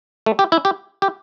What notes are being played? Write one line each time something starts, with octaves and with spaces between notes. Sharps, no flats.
A3
G4
E4
G4
G4